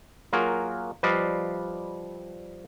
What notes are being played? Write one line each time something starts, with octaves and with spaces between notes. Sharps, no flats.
F#3 A#3 F4 F#4 G#4 A#4
F3 G3 B4 D5 D#5 F5